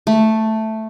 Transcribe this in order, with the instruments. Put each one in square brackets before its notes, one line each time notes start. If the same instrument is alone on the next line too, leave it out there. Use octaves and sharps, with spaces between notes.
[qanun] A3